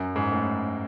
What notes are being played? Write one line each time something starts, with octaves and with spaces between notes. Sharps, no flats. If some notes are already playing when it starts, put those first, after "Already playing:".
Already playing: F#2
G#2
A2